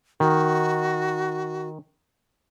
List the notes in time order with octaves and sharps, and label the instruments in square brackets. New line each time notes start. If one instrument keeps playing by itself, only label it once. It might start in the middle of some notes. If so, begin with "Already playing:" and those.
[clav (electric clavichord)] D#3 [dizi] F#4